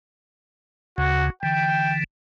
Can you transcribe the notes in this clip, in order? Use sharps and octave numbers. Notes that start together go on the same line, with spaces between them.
D2 C#3 F#4
D3 E3 G5